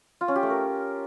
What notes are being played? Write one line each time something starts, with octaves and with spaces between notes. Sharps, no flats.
F4
C#4
G4
A3
A#4